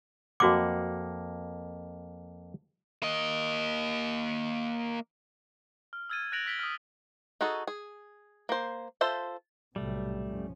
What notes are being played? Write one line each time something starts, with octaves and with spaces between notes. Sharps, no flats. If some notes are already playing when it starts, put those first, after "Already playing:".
F2 A#3 F#4 F#5 D6
A#3 D#5
F6
E6 F6 G#6 A6 D#7
F#6 A6 A#6 D7 F7 F#7
F6 B6 D7 G7
D#6 F6
D#4 F#4 G#4 A4
G#4
A#3 C5
F4 A4 C5 E5
B1 A2 C3 G3 A3
F#2 F3 C#4